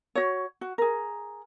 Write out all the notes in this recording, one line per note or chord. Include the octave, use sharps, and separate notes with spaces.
F#4 C#5
F#4
G#4 A#4